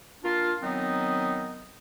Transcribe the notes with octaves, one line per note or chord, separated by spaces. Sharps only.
A#3 D4 F4
D#3 F#3 B3 C4 D#4